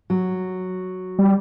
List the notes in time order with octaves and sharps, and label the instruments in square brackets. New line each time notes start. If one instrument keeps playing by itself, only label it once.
[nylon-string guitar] F#3
[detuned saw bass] G3